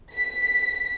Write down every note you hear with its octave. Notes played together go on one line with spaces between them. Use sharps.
B6